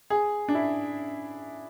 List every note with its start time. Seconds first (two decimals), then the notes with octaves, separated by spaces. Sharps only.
0.10 G#4
0.48 D4
0.55 E4